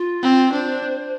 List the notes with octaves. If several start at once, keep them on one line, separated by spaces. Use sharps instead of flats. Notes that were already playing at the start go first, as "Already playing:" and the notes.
Already playing: F4
C4
D4 C5